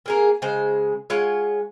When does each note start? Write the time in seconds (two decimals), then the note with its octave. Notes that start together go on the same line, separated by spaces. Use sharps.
0.06 A#3 G#4 A#4
0.42 C#3 G#3 C5
1.10 G#3 F4 C#5 F#5